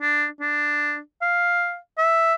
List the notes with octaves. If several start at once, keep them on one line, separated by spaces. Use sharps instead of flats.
D4
D4
F5
E5